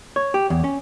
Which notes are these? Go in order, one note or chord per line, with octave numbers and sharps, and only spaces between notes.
C#5
G4
E2
C#4